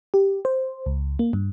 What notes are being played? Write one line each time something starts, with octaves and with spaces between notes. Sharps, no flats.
G4
C5
C#2
A#3
G2